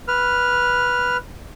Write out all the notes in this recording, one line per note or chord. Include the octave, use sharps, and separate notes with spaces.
B4 F6